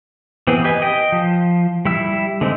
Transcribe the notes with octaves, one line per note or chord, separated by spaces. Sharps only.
E3 B3 C4 G#4
G4 B4 D#5 G#5
D#5 G5
F3
G3 E4 E6
D3 G#3 C4 D#4